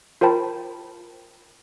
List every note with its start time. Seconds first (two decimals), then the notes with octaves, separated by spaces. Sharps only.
0.21 F4 A#4 C5 G5 A5 B5